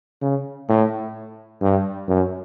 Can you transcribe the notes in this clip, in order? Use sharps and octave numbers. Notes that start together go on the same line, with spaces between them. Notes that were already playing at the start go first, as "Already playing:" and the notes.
C#3
A2
G2
F#2